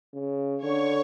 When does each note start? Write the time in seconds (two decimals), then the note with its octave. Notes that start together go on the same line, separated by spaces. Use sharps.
0.14 C#3
0.63 D3 C#5